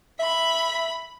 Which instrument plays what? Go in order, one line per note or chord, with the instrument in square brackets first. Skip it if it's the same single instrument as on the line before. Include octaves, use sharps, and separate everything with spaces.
[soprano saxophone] E5 [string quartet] B5